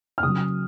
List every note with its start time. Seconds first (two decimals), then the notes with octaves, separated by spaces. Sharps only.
0.18 F6
0.23 C#3 F#3 D#6